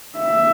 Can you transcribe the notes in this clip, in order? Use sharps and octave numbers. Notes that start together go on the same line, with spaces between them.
E5